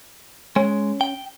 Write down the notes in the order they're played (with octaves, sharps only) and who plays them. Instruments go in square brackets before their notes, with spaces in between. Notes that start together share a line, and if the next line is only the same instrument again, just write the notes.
[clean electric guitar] G#3 [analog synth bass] C#4
[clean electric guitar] G5